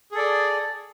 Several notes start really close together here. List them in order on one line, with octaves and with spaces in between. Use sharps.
G#4 A4 D5